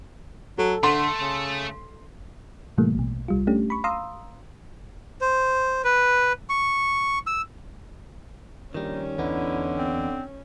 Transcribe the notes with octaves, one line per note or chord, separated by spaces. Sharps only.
F#3 A4
D3 A3 C6
C#3
A2 C3 E3 G3 A3 A#3
A#1 B2
C2 G3 F4
A3 C#4 D4 G4
B5 C#6
F5 A#5 C6 D#6 E6
C5
B4
C#6
E6
A#1 D#3 G3 C#4 D#4
E2 D3 B3 D#4 E4
C4